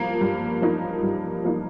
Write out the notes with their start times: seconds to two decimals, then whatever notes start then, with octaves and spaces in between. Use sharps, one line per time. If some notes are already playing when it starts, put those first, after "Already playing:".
Already playing: G2 F3 A#3
0.21 G2
0.62 F3 A#3 D#4
1.03 G2
1.44 F3 A#3 D#4